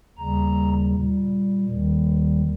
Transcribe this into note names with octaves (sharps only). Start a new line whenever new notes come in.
D#2 C#3 G3 A#5
A#2 G3
D#2 D#3 G3